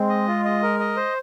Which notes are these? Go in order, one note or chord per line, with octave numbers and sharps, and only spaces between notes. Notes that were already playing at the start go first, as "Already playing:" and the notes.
Already playing: G#3 C4
D#5
F4
D#5
A#4
D#5
C5